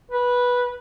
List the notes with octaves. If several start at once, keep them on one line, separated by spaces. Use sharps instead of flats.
B4